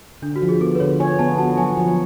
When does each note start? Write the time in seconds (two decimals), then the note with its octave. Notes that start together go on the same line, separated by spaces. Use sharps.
0.22 D3 D4
0.36 F#4
0.42 F3
0.49 G#4
0.61 B3 A4
0.75 B4
0.80 D3 C#5
1.00 C#5 G#5
1.19 B3 A5
1.38 F#4 A5
1.57 F#3 G#5
1.77 F3